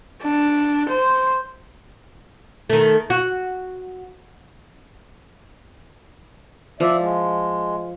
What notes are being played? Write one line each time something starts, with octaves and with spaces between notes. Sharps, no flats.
D4
C5
D#3 A3
F#4
F3 D5 E5
G#3